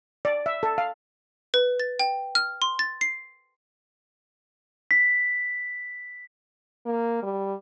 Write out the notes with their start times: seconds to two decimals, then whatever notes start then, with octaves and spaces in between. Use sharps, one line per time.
0.25 D5
0.46 E5
0.63 A4
0.78 F5
1.54 B4
1.80 A6
1.99 G5
2.35 F6
2.62 C6
2.79 A6
3.01 C7
4.91 B6
6.86 A#3
7.22 G3